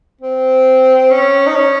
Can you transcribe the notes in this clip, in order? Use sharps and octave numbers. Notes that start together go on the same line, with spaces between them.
C4
C#4
D#4
C#4